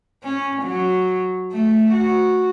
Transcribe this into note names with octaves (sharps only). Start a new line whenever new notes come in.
C#4
F#3
A3
F#4